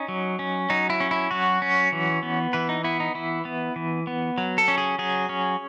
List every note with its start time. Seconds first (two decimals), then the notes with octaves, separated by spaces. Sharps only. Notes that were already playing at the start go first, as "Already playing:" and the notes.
Already playing: C#4 D#4
0.08 F#3
0.39 C#4
0.70 F#3 D#4
0.90 E4
1.00 C#4
1.11 E4
1.31 F#3 F#4
1.62 C#4
1.92 E3
2.23 B3
2.53 E3 B4
2.69 D#4
2.84 B3 E4
3.00 D#4
3.15 E3 E4
3.45 B3
3.76 E3
4.07 B3
4.38 F#3
4.58 A4
4.68 C#4
4.78 G#4
4.99 F#3 G#4
5.29 C#4